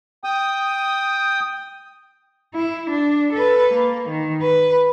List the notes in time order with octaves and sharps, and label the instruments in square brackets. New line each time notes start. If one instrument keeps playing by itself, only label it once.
[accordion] G5 D#6
[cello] E4
D4
A4 B4
A#3
D#3
B4